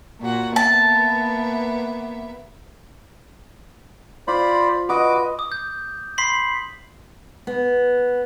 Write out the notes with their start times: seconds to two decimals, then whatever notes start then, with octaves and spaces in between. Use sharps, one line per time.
0.21 A#2 F#4 F#5
0.56 A#3 B3 E5 A5
4.28 F4 C5 D5 B5
4.89 F#4 B4 D#5 D6
5.39 D6 D#6
5.52 G6
6.18 B5 C6 B6 C7 F#7
7.47 B3